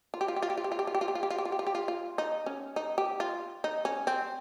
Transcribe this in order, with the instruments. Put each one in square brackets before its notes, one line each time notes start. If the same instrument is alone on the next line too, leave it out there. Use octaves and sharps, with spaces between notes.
[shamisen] F4
G4
F4
G4
F4
G4
F4
G4
F4
G4
F4
G4
F4
G4
F4
G4
F4
G4
F4
G4
F4
G4
F4
F4
D#4
C#4
D#4
G4
F4
D#4
C#4
C4